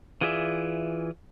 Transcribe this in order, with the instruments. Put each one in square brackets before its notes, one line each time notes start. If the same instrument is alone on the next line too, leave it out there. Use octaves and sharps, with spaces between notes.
[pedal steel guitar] E3 F4 G#4 D5 E5